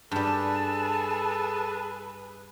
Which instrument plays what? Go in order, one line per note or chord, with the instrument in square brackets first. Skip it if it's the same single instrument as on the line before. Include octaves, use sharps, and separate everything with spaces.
[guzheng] G2 G3 [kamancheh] G#4 B4 [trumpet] A4 [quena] A5